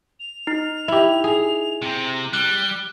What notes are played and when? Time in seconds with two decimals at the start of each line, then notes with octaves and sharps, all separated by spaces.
0.20 F7
0.47 D#4
0.88 E4 G4
1.24 G#4
1.82 C3 A#5
2.33 G3 F#6 G7